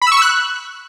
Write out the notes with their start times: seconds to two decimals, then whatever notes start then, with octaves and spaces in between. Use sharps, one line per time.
0.02 B5
0.07 E6
0.12 C#6
0.17 E6
0.22 F#6